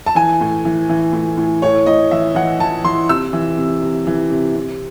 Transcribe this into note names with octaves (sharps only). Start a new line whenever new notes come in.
A5
E3 G#5
A2
E3
E3
A2
A2
A2 C#5
A2 D#5
E3 E5
E3 F#5
E3 A5
E3 C6
C3 E6
E3
C3
C3
E3
C3
C3